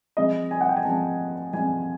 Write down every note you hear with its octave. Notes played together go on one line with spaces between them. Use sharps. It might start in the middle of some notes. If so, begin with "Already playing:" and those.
F3 G#3 C4 D#5
G#5
F#5
G5
G#5
F3 G#3 C4 A5
F3 G#3 C4 G#5